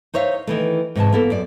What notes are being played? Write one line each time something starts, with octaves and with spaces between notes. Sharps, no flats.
D#4 C5 C#5 E5 F5
D#3 E3 A3
G#2 C3 E3 A5
A#3 B3 A4
F#2 D5